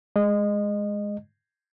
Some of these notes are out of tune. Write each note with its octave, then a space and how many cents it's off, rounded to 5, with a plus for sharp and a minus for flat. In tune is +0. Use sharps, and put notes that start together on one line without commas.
G#3 +0 D#5 -20